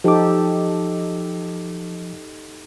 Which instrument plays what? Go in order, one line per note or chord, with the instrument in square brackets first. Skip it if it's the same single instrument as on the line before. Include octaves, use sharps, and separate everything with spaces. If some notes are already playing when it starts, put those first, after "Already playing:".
[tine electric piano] F3 D6 [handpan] D#4 G4 A4